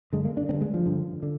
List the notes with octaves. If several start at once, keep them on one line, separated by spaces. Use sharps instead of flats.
G2 D3 G#3
A#3
D4
G2 D3 C4
G#3
F3
G2 D3
D3